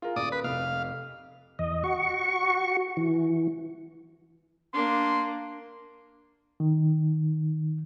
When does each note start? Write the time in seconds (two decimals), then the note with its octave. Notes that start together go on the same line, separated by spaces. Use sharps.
0.02 F4 G#4 A#4
0.16 D#1 D5 D#6
0.32 B4
0.44 F1 F5
1.59 E2 D#5
1.84 F#4 C#6
2.97 E3
4.74 A#3 D4 C6
6.60 D#3